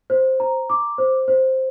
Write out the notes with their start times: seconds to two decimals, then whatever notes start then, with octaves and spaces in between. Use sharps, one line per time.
0.10 C5
0.40 A#5
0.70 D6
0.98 C5
1.28 C5